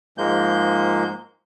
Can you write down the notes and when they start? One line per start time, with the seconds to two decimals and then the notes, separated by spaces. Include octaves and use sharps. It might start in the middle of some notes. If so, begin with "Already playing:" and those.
0.18 G#2 F3 G#3 A#3 G6